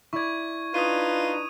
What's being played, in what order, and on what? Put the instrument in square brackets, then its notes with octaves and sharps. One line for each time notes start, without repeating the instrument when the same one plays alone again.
[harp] E4 D5 [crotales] C#6 G#6
[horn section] D4 D#4 B4 [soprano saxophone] F4 [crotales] D#6 D#7